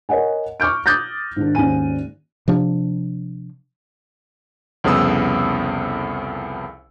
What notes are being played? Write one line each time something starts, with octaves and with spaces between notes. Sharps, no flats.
A#4 C#5 D#5 F#5 G#5
C#6 D6 F6 G6 D7
D6 D#6 F#6 G6 A6 A#6
G#2 D#3 D4
G#1 D#2 G#2 C#4 G#5 D#7
C3 F3 D4
C2 F2 C#3 B3 D#6 E6